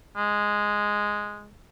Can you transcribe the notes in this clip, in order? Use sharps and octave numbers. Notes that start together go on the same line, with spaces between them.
G#3